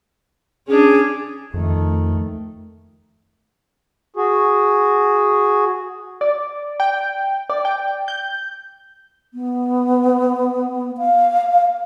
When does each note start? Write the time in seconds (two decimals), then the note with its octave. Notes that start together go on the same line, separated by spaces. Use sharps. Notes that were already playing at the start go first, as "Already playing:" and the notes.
0.68 C#4 D4 G#4
1.54 F2 D#3 A3
4.16 F#4 G#4
6.21 D5
6.80 G5
7.50 D5
7.65 G5
8.08 G6
9.34 B3
10.98 F5